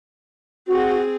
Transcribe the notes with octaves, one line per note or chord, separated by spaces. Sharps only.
C4 F#4 G#4